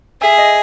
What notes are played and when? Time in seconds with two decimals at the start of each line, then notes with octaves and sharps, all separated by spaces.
0.22 G#4 E5
0.38 D#5